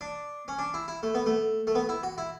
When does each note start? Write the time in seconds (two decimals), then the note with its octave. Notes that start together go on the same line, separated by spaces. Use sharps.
0.01 D4
0.48 C#4
0.59 D4
0.74 E4
0.88 E4
1.03 A3
1.15 B3
1.26 A3
1.67 A3
1.75 B3
1.89 E4
2.03 F#4
2.18 E4